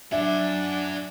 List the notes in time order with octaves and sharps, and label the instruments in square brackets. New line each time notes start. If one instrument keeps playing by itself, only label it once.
[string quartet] F#3 [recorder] D4 [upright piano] E5 [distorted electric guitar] F#5 G#5